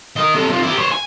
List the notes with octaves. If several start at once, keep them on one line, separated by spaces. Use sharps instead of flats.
A#4 D#5
C3 A4
C3 F4
E4 G4
C5 C#5
G#5